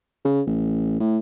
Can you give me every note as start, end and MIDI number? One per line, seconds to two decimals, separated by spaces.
0.25 0.41 49
0.47 0.99 33
1.00 1.18 45